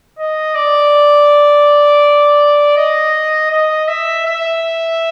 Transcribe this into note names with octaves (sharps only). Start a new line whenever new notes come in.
D#5
D5
D#5
D#5
E5
E5